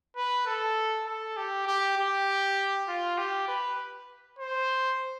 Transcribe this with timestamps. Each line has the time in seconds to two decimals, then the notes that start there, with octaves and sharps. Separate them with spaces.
0.16 B4
0.46 A4
1.06 A4
1.37 G4
1.67 G4
1.97 G4
2.88 F4
3.18 G4
3.48 B4
4.39 C5